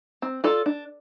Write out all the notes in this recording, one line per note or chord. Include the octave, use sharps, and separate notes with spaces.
C4
F4 A4 D5
D4